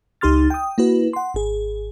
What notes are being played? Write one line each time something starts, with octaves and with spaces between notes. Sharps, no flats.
C#2 D#4 G4 C6 F6 A6
G5 D#6
A#3 E4 F#4 B4
F#5 C6
G#1 G#4